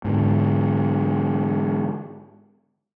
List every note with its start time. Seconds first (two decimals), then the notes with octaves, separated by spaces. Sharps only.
0.05 G#2 D3